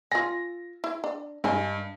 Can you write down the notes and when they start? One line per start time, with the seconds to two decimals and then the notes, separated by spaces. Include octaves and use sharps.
0.11 F4 G#5 A#6
0.84 E4
1.04 D4
1.44 G2 A#4 D#5 G#5